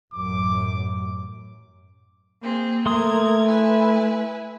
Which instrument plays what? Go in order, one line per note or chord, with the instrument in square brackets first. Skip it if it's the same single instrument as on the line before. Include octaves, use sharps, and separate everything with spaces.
[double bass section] A1 F#2 [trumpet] D6
[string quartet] A#3 C4 G#4
[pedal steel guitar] A3 C6 D#6 [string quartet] A#4 G#6
[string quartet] E4 B4 G#5